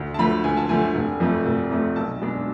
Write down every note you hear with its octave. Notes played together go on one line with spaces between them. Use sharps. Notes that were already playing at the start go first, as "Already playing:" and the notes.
Already playing: D2
A5
D3 F3 A3 B5
D2 G#5
A5
D3 F3 A3 G#5
F1
F2 F3 A3
F1
F2 F3 A3
B1 A5
B2 G#3 D4